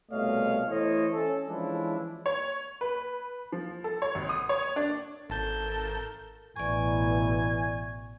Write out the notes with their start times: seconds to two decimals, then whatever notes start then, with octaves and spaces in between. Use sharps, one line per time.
0.11 C2 B2 A3 C#5 D#5 F5
0.69 E3 A3 E4 C5 C#5 D#5
1.14 C#4 A4
1.48 E3 F3 G#3 C#4 D4 E4
2.26 C#5
2.81 B4
3.52 F3
3.84 A4
4.02 C#5
4.15 G#1
4.29 D#6
4.49 C#5
4.76 D4
5.30 G#1 A4 A#4 A5 G6
6.56 A1 B2 E3 D5 G#5 C#6